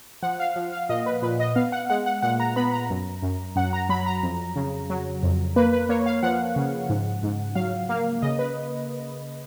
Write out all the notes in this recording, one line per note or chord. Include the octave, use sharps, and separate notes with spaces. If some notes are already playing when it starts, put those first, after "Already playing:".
F3 F#5
F5
F3
F5
A#2 D#5
B4
A#2 B4
D#5
B3 F5
F#5
G#3 F#5
F#5
A#2 F#5
A#5
B3 B5
A#5
F#2
F#2
F#2 F#5
A#5
F#3 B5
A#5
F2
C#3
F#3
F2
A#3 B4
B4
A#3 C#5
F5
F3 F#5
C#3
G#2
G#2
F#3 F5
A#3 F5
C#3 D#5
B4